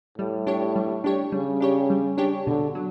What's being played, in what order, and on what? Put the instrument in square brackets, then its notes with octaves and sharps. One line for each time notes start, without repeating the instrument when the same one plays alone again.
[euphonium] A2 [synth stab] G3
[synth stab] D4 G4 C#5
G3
D4 G4 C#5
[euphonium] C#3 [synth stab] G3
[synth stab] D4 G4 C#5
G3
D4 G4 C#5
[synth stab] B2 [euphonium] D3
[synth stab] F#3